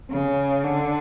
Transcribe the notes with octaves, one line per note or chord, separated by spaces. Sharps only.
C#3
D3